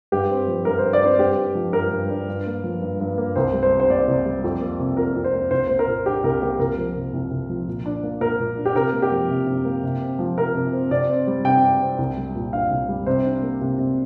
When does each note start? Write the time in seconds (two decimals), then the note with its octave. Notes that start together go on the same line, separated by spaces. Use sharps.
0.12 G2 G4
0.30 C4
0.47 F3
0.65 G2 A#4
0.79 C5
0.84 G2
0.93 D5
1.01 C4 C5
1.19 G2 G4
1.38 D4
1.55 F3
1.73 G2 A#4
1.91 G2
2.09 D4
2.28 G2
2.46 A#3
2.64 F3
2.82 G2
3.00 G2
3.18 A#3
3.36 C2 C5
3.53 G3
3.63 C5
3.71 C3
3.80 C5
3.89 A#3 D5
4.07 C2
4.26 G3
4.44 F2
4.61 A#3
4.80 C3
4.97 F2 A#4
5.16 F2
5.24 C5
5.34 A#3
5.51 C2 C5
5.67 A#3 C5
5.79 A#4
5.87 A#2
6.06 D4 G4
6.24 C2 A#4
6.42 A#3 G4
6.59 C2 A#4
6.77 F3
6.96 C3
7.13 C2
7.31 C2
7.50 F3
7.68 A#2
7.86 D4
8.03 A#3
8.21 A#2 A#4
8.40 A#2
8.58 D4
8.66 G4
8.75 C3 A#4
8.93 A#3
9.02 G4
9.12 F3
9.29 C3
9.47 C3
9.65 A#3
9.83 C3
10.02 C4
10.19 F3
10.37 C3 A#4
10.55 C3
10.73 C4
10.91 C3 D5
11.10 C4
11.27 G3
11.44 C3 G5
11.64 C3
11.82 C4
11.98 C2
12.17 G3
12.35 A#2
12.53 D4 F5
12.71 C2
12.88 G3
13.06 C3 C5
13.24 D4
13.43 A#3
13.62 C3
13.78 C3